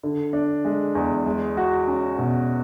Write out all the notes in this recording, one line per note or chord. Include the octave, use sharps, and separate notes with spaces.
D3
D4
G#3
E2
G#3
F#4
C#4
B2